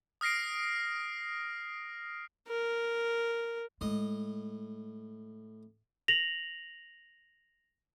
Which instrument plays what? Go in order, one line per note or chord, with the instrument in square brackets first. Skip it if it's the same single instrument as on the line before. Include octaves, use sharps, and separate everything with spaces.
[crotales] D#6 F6 A#6 C7 D7
[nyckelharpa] A#4
[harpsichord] A2 D#5 [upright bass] G#3 A3
[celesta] A#6 F7 F#7